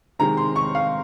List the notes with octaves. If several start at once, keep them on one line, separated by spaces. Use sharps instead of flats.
C3 D#3 G#3 A#5
C6
C#6
F5